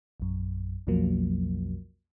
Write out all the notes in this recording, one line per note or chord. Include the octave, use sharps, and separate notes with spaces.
A#1 F#2
B1 F2 B2 F3 F#3 A#3